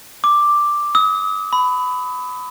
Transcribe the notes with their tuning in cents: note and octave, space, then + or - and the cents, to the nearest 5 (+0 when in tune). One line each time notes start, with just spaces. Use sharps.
D6 +5
D#6 +40
B5 +20